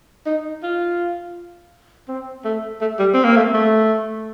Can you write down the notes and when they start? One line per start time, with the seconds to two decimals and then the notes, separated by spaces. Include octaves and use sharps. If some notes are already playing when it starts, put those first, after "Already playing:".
0.26 D#4
0.63 F4
2.08 C4
2.45 A3
2.81 A3
2.99 G3
3.14 C4
3.25 A#3
3.36 A3
3.54 A3